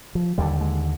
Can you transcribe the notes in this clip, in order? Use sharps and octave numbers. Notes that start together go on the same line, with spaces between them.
F3
D#2 D3 G3
G#3